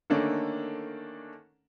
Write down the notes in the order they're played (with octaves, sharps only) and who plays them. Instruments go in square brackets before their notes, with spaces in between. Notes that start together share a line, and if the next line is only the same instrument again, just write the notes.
[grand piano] D3 D#3 A3 A#3 C#4 D4